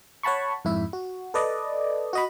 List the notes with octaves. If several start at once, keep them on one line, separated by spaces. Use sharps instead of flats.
C#5 F#5 A5 B5 C#6
F2 G#2 E4 E5
F#4
A4 B4 D5 D#5
F#4 D#5 B5